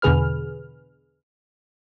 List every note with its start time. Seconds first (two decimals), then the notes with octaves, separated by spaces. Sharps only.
0.02 E2 B2 D3 G#4 B4 F6